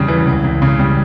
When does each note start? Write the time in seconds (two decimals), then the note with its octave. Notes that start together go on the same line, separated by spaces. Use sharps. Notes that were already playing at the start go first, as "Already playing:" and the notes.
Already playing: E2 C#3 G3
0.08 E3
0.27 C#2
0.44 C#2
0.62 C#3
0.79 G3